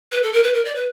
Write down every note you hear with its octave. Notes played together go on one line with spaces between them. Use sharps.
B4
A4
A#4
B4
A#4
D5
B4